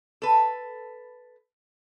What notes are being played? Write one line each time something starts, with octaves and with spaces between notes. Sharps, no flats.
A4 B4